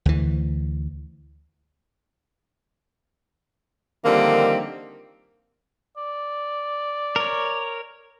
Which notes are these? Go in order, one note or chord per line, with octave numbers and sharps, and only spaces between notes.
D2 E3
D3 D#3 F3 G3 A#3 C4
D5
A#4 C#5